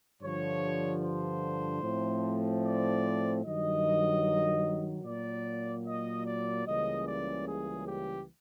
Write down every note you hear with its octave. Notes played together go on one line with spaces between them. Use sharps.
G2 D3 F3 C#5
C5
A2 F3 A3 C4
D5
G2 D#3 F#3 D#5
A#2 F#3 A#3 D5
D#5
D5
C#2 C#3 E3 G3 A#3 D#5
D5
G#4
G4